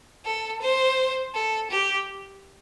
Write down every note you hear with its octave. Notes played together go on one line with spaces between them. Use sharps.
A4
C5
A4
G4